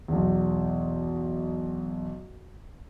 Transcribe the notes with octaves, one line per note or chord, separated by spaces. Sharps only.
B1 E2